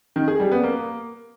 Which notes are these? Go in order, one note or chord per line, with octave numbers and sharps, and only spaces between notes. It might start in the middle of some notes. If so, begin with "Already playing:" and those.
D#3
G#4
G3
B3
A#3